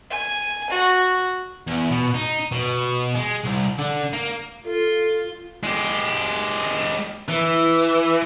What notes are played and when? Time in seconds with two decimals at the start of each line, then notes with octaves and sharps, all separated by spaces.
0.10 G#5
0.70 F#4
1.67 E2
1.91 B2
2.14 D#4
2.52 B2
3.15 G#3
3.44 C2
3.78 D3
4.13 A#3
4.66 F4 A4
5.63 G#3 G4
7.28 E3